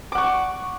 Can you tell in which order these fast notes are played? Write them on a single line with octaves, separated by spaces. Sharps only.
D6 F#5 C#6